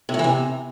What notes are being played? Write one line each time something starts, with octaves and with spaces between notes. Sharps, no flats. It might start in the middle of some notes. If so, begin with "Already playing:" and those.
C3
A2
E3
C3